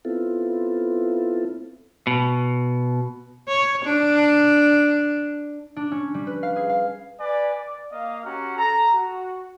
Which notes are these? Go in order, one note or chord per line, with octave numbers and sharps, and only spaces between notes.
B3 C4 E4 F4 A4
B2
C#5
D4
D4
C#4
G3
B4
F5
G#4
F5
B4 D5 G#5
D5
A#3 D#5 F5
C#4 F#4 G4 F#5 A#5
A4 A#5
F#4